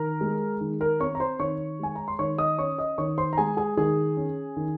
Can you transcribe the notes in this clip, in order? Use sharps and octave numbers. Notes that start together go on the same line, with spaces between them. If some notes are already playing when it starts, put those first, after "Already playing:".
Already playing: D#3 A#4 A#5
G#3
D#3
A#4 A#5
C4 C#5 C#6
A#5
C5 C6
D#3 C#5 C#6
G#3 G#5
A#5
C6
D#3 C#5 C#6
D#5 D#6
C#4 C#5 C#6
D#5 D#6
D#3 C#5 C#6
C5 C6
A#5
G#3 G#4 G#5
G#4 G#5
D#3 G#4 G#5
C#4
D#3